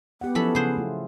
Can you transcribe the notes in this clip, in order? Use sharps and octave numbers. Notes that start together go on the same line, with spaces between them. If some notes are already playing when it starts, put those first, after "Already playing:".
B3 G4 F#5
F3 F#3 C#4 E4 A4 B5
C#3 G#4 C5 F#5
A3 F4